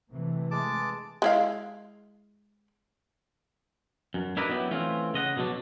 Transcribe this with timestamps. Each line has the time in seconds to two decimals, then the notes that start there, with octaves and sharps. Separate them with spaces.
0.11 C3 E3 A3
0.51 G#3 A5 D6
1.22 G#3 E4 F5
4.14 F#2
4.37 D4 E4 A#4 B4 D5 D#5
4.49 F#3 B3 E4 G4
4.71 E3 A3 C4 C#4 F4
5.14 C#3 D#5 F#5
5.37 B2 D3 F#3 D4